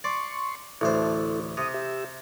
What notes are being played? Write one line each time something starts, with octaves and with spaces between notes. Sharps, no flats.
D5 C6 C#6
A1 D2 E4 A4 C5
C3 D#6
G4 E5